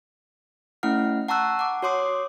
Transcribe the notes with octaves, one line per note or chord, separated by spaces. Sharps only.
A3 C#4 E4 F#5 F6
F#5 A5 A#5 C#6 E6 F#6
F#5 D6
F#4 C#5 C6 D6 D#6